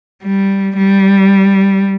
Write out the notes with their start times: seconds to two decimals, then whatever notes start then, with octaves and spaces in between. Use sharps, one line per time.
0.24 G3
0.76 G3